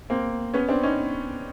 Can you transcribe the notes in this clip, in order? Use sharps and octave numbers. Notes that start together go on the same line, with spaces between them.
A#3 C4
B3 C#4
C4 D4
C#4 D#4